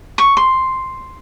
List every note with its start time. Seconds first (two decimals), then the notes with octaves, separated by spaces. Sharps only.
0.18 C#6
0.37 C6